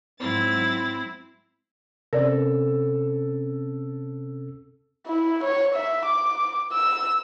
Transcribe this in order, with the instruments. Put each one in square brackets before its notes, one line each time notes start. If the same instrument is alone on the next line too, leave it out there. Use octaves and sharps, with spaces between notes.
[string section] G#2 F#3 A6 [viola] C4 E4
[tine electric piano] C3 C4 C#4 [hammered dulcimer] A4 [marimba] A#4 D5
[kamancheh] E4
C#5
E5
D6
E6